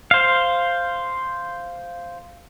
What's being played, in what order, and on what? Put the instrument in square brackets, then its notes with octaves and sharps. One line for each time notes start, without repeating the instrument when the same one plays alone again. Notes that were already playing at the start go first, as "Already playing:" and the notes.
[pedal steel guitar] C5 F5